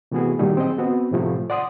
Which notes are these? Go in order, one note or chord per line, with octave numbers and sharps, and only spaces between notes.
C3 E3 A3 B3 F#4 G#4
A#2 D#3 F#3 G3 A#3 D#4
C4 G#4 D#5
B3 C4 F#4
A2 C3 F3 A3
D5 F#5 C6 D#6